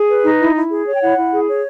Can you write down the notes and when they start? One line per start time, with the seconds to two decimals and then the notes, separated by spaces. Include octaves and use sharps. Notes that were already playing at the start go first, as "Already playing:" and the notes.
Already playing: G#4
0.09 B4
0.24 D#4
0.40 E4
0.56 E4
0.70 G#4
0.86 C#5
0.95 G5
1.02 E4 F#5
1.18 E4
1.32 G#4
1.48 C#5